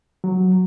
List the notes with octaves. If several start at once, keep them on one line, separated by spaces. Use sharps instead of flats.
F#3